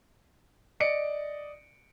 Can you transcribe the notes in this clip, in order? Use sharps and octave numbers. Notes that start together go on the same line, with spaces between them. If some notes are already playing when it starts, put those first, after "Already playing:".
D5 D#5 C#7 D7